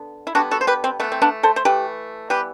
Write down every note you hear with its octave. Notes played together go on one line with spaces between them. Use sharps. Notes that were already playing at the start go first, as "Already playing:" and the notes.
Already playing: D3 B3
E4
D3 G3 B3 D4 F#4
F#4 A4
C5
G4 B4
C4
E3 A3 B3
C4
B3 D4
A4 C5
C5
E3 A3 G4 B4
E3 G3 B3 G4 B4